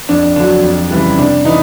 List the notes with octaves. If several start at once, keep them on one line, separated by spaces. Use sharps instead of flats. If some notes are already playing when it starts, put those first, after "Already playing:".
F2 D4
D3 F#3 D4
F2
C#3 E3 G3
C3 D4
E3 D#4